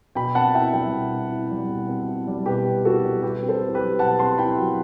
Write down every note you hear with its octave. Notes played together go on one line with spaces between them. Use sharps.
B2 G5 B5
C4 F#5 A5
E4 E5 G5
G3 E5 G5
B2
C4
E4
G3
B2
C4
E4
G3
B2 G4 B4
C4
E4 F#4 A4
G3
B2 G4 B4
C4
A4 C5
E4
G4 B4
F#3
B2 F#5 A5
C4 A5 C6
E4 G5 B5
F#3